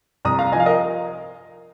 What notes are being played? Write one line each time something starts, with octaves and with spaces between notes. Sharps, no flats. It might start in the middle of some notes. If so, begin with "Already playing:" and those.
C2 A#5 D#6
F5 A#5
F3 D#5 G#5
F5
A#4 D#5